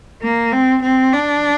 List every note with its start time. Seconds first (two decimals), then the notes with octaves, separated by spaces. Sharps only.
0.23 A#3
0.52 C4
0.83 C4
1.13 D4